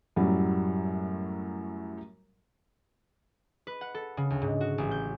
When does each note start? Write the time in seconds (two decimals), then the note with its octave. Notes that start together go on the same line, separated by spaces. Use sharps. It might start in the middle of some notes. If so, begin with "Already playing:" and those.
0.16 F#2 A2 F#3 G3
3.67 B4
3.81 F#5
3.94 A4
4.17 C#3
4.30 D2
4.42 G#2
4.61 F#4
4.78 A1
4.91 G6